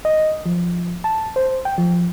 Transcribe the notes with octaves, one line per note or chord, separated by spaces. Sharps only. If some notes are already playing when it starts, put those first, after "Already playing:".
D#5
F3
A5
C5
G5
F3